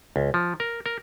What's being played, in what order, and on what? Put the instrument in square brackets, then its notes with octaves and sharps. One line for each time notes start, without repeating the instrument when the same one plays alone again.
[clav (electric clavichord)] C#2
F3
A#4
A#4